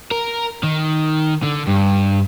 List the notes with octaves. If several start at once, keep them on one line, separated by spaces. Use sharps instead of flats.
A#4
D#3
D3
G2